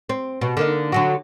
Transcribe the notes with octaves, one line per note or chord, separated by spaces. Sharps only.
C4
B2
D3 A#3 D#4
D3 F#3 F#4